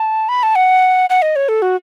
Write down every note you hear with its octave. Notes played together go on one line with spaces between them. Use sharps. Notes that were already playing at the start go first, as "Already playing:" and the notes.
Already playing: A5
B5
A5
F#5
F#5
D#5
C#5
A4
F#4